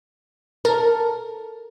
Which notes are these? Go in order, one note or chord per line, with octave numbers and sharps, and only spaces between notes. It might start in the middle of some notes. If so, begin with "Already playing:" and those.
A4 A#4